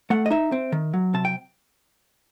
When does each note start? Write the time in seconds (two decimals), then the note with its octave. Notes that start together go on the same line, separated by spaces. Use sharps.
0.10 A3 F#5
0.26 D#5
0.31 D#4 E5
0.52 C4
0.72 D#3
0.94 F#3
1.14 C3 A5
1.25 G5